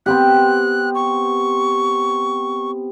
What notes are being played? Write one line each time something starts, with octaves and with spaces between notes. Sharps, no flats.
B3 C4 G4 F#6
C#6